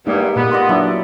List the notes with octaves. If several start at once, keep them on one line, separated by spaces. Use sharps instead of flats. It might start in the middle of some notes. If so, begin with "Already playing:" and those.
E2 G2 G#3 A#3 D#4 G4
A#2 A#3 B3
D5 D#5 C6
F#3 D4 E4 D5